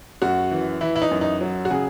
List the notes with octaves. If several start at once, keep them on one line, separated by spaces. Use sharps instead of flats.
F#2 F#4
E3
E3 E4
E4
D#4
F#2
D#4
F#3
F#4
C#3 G#4